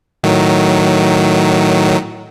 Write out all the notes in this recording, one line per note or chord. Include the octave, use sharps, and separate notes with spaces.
A2 D#3 F#3